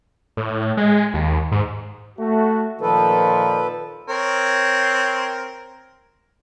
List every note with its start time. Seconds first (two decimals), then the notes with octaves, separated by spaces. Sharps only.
0.37 A2
0.77 G#3
1.14 D#2
1.52 G#2
2.18 A3 F#4
2.81 A#2 D#3 F3 A4 B4
4.09 C4 A#4 C#5